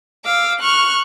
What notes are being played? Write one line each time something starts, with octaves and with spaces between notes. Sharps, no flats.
F5 D6 E6
C#6 F6 F#6